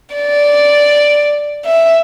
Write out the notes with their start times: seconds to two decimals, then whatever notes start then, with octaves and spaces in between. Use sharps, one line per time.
0.15 D5
1.65 E5